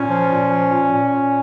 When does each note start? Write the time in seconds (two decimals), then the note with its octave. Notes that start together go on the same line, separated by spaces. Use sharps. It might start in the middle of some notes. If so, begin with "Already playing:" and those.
Already playing: A#2 C#4
0.09 F3
0.30 A#2
0.51 F3
0.71 A#2
0.92 A#2
1.13 A#2